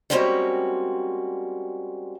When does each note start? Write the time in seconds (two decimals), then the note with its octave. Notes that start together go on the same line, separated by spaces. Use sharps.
0.10 G3 G#3 A#3 C4 C#4 F#4